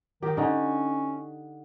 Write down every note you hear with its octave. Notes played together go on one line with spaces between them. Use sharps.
D#3 G4
D3 C#4 D#4